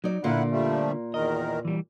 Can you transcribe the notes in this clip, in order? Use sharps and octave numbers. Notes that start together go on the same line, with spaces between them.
F#3 D#4 D5
A#2 D3 A#3 E4 F4 F#5
F3 G3 A3
E2 D#3 A#4 D#5
E3 G3